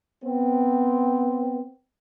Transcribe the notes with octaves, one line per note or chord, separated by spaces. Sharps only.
B3 C4